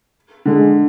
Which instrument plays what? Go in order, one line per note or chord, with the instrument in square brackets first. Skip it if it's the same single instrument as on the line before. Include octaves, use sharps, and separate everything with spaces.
[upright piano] D3 [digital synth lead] G#3